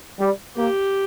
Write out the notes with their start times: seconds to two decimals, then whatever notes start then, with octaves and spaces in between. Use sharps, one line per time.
0.19 G3
0.56 A#3 G4